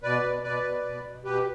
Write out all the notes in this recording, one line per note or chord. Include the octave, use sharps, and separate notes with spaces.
B2 B4 D5
B2
B2 B4 D5
B2
B2
B2
B2 G4 B4